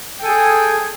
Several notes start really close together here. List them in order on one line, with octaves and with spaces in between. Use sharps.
G5 A4 G#5 G#4